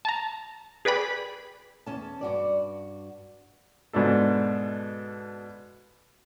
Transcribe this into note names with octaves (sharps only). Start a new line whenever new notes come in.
A5 A#5
G#4 B4 D5 G5 B5
E2 C#4 A5
G2 F#4 D5
G#2 B2 D4 A4